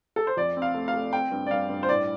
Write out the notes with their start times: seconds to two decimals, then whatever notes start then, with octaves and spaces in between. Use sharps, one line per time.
0.16 A4
0.27 C5
0.37 F2 D5
0.57 C4
0.62 F5
0.74 A3
0.88 F5
0.94 A3
1.13 C4 G5
1.31 G2
1.47 D5
1.51 G2 F5
1.70 G2
1.83 C5
1.89 A2 D5